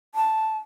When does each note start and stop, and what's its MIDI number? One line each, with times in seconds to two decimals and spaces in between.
0.15 0.58 81